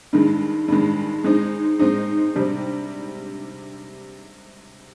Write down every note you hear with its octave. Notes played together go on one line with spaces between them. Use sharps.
G2 D#3 G#3
G2 D#3 G#3
G#3 C4 D#4
G#3 C4 D#4
C3 G3 D4